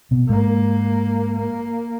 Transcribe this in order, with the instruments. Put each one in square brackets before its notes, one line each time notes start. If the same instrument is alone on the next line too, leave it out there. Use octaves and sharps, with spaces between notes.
[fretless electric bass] B2 B3
[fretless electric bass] G#2 G#3 [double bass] A#3
[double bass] A#3